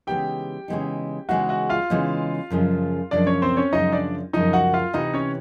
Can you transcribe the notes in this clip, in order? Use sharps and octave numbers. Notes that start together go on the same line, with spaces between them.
C#3 E3 G#3 B3 D#4 G4 G5
C#3 E3 G#3 B3 D#4
C#3 E3 G#3 B3 D#4 F#4 F#5
F#4 F#5
F4 F5
C#3 E3 G#3 B3 D#4
F#2 C#3 F3 G#3
F#2 C#3 F3 G#3 D4 D5
C#4 C#5
C4 C5
C#4 C#5
F#2 C#3 F3 G#3 D#4 D#5
D4 D5
F#2 C#3 F3 G#3 D#4 D#5
F#4 F#5
F4 F5
C3 E3 A3 D#4 D#5
C#4 C#5